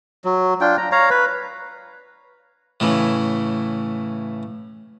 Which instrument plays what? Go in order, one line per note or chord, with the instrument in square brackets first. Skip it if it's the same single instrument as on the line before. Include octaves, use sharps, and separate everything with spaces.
[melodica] F#3
D4 F4 G5
A#5
C#5 F5 A#5
B4
[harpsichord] A2 C#3 E3